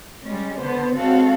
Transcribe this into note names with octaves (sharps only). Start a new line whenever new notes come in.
G3 G#3 C#4
D3 B3 C5
G#3 C4 F#4 A4 C#5 F5